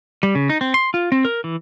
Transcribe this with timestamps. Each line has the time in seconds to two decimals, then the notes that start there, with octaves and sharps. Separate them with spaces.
0.23 G3
0.35 C#3
0.49 D#4
0.61 C4
0.74 C6
0.94 F4
1.12 C4
1.25 A#4
1.44 E3